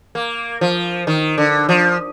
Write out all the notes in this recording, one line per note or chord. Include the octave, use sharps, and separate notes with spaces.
A#3
F3
D#3
D3
F3